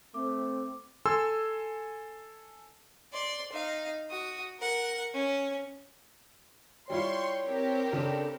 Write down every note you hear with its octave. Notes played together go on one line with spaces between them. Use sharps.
A3 C4 D6
A4 G#5 C6 E6
D5 C6
D#4 F5
F#4 D#6
A#4 F#5
C#4
G3 E4 F4 C#5 G5 C6 C#6
C4 G4 A#4
C#3 D4 A4